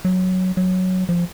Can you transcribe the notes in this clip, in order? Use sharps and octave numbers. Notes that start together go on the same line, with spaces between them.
F#3
F#3
F3